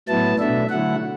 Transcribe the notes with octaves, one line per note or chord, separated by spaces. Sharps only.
A2 F#3 B3 E4 A5
B2 A3 D4 E5
D3 F#3 A3 E4 F#5